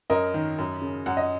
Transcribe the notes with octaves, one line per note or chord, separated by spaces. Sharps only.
F#2 A#4 D#5
D#3
F#2
C#3
F#2 F#5
D#5